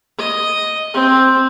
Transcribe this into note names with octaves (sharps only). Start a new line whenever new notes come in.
D#5
C4